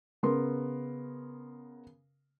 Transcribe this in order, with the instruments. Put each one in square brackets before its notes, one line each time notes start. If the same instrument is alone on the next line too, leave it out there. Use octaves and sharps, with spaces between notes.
[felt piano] C#3 B3 A#4 C6